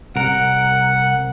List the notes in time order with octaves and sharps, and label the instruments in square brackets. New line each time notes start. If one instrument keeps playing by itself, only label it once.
[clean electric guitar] C2 A#4 [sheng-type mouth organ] F#5